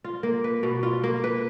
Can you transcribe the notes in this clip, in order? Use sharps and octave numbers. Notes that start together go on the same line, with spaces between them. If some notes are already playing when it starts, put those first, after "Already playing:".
F4
A#3
B4
B2
F4
A#3
B4